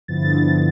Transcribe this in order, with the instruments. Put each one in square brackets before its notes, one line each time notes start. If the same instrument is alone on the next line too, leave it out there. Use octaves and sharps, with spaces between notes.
[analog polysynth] G2 D3 F3 B3 E4 A6